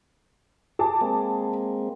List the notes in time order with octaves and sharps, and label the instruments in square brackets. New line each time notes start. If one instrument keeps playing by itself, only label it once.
[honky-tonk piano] G#4 A5 D6
[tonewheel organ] G#3 A#3 C4